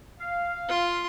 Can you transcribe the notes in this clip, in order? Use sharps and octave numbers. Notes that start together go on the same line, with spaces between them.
F5
F4 C6